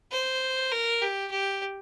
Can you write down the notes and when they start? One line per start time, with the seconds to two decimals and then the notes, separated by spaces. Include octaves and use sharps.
0.12 C5
0.72 A#4
1.02 G4
1.31 G4